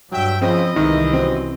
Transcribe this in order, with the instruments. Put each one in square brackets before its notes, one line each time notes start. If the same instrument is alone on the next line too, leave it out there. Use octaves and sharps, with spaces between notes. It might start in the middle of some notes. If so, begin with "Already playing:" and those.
[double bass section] G2 [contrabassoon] F#3 [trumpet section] E5 G5
[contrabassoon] C#3 [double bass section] F3 [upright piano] C4 [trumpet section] E4 D#5
[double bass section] C2 E3 [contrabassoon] G#2 [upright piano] D#3
[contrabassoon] F#2 [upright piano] C4